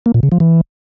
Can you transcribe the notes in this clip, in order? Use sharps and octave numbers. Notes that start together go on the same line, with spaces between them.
A#3
A#2
C#3
F3
E3